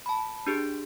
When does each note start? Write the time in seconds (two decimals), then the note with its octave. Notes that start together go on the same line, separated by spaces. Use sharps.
0.06 A5 B5
0.47 D4 G4 G#4